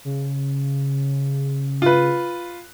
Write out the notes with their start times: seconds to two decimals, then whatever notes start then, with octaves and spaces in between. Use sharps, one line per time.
0.05 C#3
1.82 F4 B4